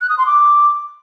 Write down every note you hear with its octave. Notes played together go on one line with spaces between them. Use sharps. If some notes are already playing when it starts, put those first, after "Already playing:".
F#6
D#6
C6
D6